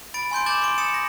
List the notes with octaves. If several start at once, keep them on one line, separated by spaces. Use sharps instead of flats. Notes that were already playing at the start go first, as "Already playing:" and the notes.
B5 A6 D7
G#5 C6 G6 D7
D6 G6 A6 E7 F#7
C6 D7
D#6 A6 C#7 E7
A#6